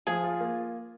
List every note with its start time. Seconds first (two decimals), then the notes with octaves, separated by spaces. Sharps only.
0.07 F3 G#4
0.24 F4
0.40 A#3